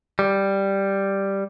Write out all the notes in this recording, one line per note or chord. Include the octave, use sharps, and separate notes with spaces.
G3